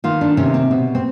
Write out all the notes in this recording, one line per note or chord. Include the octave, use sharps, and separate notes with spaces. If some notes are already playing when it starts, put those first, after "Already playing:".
D#3 F4
D4
C3 C#4
C4
B2
C4